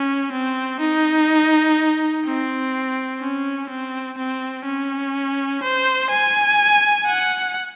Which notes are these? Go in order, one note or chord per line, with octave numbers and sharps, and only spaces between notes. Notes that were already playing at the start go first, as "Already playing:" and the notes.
Already playing: C#4
C4
D#4
C4
C#4
C4
C4
C#4
C5
G#5
F#5